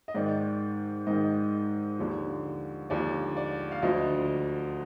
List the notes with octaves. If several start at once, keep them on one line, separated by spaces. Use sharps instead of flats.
D#5
G#2 D#3 D5
G#2 D#3 D#5
D#2 D3 F3
D#2 D3 F3 D5
D5
F5
D2 D3 F3 D#5